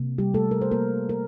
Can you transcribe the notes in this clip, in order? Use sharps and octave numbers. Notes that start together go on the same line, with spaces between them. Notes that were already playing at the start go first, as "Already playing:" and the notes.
Already playing: C3 A#3
G3 G4
A3 A4
A#4
C5
A#3 A#4
A#4